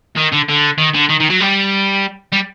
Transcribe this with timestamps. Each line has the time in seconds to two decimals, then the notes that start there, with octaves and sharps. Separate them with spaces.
0.16 D#3
0.32 D3
0.49 D3
0.78 D#3
0.94 D3
1.09 D#3
1.20 D#3
1.30 F#3
1.40 G3
2.32 G3